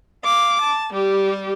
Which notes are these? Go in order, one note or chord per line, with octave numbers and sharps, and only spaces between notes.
F5 D6
A5
G3 G4